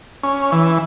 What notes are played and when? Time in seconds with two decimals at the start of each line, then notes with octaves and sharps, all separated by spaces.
0.23 C#4
0.52 E3